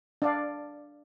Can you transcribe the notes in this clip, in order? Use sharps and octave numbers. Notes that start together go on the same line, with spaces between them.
D4 D5 F5